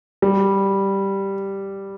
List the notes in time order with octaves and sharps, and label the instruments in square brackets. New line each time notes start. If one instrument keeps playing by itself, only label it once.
[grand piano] G3